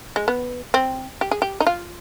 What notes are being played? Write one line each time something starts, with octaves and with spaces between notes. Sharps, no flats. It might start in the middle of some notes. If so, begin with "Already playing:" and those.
G#3
B3
C4
G4
G#4
G4
D#4
F4